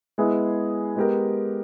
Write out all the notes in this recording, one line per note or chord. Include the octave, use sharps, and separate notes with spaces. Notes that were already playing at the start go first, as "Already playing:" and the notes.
G#3 B3 E4 G#4
G#3 B3 G4 A#4